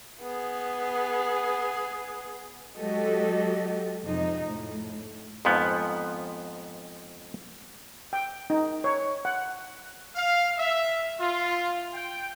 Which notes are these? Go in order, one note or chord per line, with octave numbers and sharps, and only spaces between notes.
B3 G#4
F#3 G#3 F#4 G4 A4 D#5
F2 C3 G#3 D#4 D#5
A2
F2 G#2 F3 B3
G5
D#4
C#5
F#5
F5
E5
F4
G5